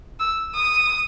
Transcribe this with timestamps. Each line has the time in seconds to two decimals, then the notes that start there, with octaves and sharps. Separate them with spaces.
0.20 E6
0.55 D#6